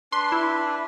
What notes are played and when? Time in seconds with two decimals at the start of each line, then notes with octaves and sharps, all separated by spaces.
0.12 D4 B4 C6
0.32 E4